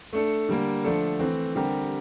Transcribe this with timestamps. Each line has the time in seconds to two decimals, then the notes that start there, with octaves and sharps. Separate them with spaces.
0.13 A3 D4 A4
0.49 D3 G3 A#3
0.84 D3 F3 A3 D4 A4
1.19 E3 A3 C4
1.55 D3 G3 C4 G4 A#4